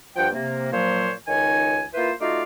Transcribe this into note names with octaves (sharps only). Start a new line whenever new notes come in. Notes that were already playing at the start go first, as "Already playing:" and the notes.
G2 F3 F#5 G5
C3 A#3
A#2 F3 F#3 A#3 C5 C#5
C#2 D#3 D#4 C#5 G#5
A#3 E4 F4 B4 C5
A3 D#4 F4 F#4 D5 F5